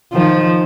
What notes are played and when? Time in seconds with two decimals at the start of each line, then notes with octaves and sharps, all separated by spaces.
0.13 D#3 F3